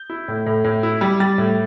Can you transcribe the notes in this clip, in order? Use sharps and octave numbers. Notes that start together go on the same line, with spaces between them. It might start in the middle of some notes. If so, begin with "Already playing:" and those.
Already playing: G6
E4
A2
A2
A2
E4
G3
G3 A6
A2